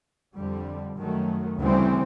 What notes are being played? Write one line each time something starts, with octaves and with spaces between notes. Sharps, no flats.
F2 D3 G3
F#2 D#3 F#3 A3
D2 C#3 E3 G3 C4